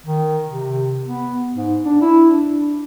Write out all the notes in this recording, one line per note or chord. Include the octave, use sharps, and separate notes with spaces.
D#3
C3
B3
G#2
D4
E4
D4